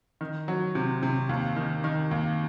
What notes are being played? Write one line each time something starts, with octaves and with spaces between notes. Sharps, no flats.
D#3
F#3
C3
C3
D#2
D#3
D#3
D#2